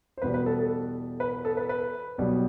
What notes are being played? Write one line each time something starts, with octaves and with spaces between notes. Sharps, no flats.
C5
E2 B2 G3 B4
B4
A4
A4
B4
A4
B4
B4
B1 B2 G3